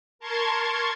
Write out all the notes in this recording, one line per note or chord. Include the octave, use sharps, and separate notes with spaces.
A#4 A5 C6 C#6 G#6